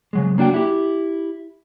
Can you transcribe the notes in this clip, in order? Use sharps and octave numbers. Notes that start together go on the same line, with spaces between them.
C#3 F#3 G#3
A#3 D4 F#4 G5
E4 G4